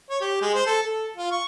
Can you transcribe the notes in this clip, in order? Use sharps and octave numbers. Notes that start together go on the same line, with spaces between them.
C#5
G4
G#3
C5
A4
A4
F4
C#6